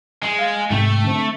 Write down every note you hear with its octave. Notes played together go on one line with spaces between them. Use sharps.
G#3
F5 A6
G#2 C3 A3 G5
D3 C4